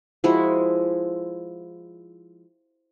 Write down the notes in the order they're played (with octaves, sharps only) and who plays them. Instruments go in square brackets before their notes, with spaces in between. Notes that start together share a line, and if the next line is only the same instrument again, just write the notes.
[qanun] F3 G#3 E4 F#4